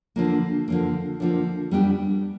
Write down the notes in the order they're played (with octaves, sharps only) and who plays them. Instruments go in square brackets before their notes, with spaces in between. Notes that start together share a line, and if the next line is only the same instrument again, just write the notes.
[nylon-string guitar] D3 F3 A#3
D3 F3 A#3
D3 F3 A#3
G3 B3 D4 G4